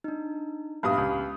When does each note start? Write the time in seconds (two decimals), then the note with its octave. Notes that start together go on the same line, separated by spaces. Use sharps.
0.04 D4 D#4
0.83 A#1 G2 G4 F5 B5 D#6
0.97 C#2